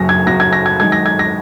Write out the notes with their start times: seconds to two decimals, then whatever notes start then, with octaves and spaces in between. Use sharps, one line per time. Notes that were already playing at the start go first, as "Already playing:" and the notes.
Already playing: F#1 F#2 F#3 A#6
0.09 G#6
0.26 F#1 F#2 F#3 A#6
0.40 G#6
0.53 A#6
0.66 G#6
0.80 F#2 D#3 G#3 G#6
0.92 A#6
1.06 G#6
1.19 A#6